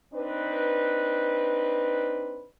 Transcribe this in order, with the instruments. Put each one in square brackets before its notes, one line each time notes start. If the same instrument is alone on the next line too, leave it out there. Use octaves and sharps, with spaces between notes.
[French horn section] C4 D4 D#4 B4